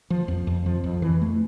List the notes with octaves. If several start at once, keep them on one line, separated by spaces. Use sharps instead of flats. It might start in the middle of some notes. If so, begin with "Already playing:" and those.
F3
F2
F2
F3
F2
E3
A3